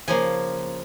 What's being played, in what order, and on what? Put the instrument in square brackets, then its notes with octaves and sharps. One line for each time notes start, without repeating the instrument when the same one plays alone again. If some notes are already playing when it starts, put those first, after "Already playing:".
[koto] C#3 F3 A#3 G#5